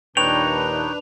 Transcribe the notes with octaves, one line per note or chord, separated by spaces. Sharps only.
D#2 A#2 D4 D#4 B4 C#5 G5 F7